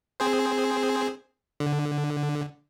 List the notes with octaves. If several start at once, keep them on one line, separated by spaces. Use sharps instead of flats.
C4 G#4 C5
D3